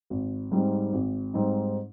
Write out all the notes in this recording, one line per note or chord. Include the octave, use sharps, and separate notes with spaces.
G#1
G#2 G3 C4 D#4
G#1
G#2 G3 C4 D#4